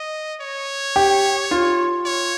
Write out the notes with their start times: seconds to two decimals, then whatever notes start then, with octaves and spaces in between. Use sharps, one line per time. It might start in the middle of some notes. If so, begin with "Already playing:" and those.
Already playing: D#5
0.41 C#5
0.96 G4
1.51 F4
2.06 C#5